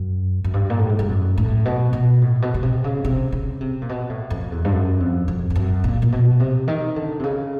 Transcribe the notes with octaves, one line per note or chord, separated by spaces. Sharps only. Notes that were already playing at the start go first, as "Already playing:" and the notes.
Already playing: F#2
F#2
G2
A#2
A2
G#2
G2
F#2
A2
B2
B2
A2
B2
B2
C3
C#3
C3
C#3
C3
A#2
B2
A2
F2
E2
G2
F#2
F2
F2
F2
F#2
A#2
A#2
B2
C3
D#3
D3
C3
C#3